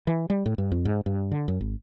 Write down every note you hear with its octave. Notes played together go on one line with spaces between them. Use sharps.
E3
G3
A2
G2
F2
G#2
G2
D3
F#2
G#1